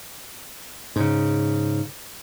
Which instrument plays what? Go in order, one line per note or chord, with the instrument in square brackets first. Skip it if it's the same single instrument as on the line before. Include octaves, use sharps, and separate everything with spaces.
[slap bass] G#2 C#3